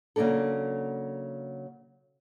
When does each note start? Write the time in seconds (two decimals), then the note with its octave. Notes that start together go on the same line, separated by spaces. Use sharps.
0.16 C#3 F#3 A#3 D4 A4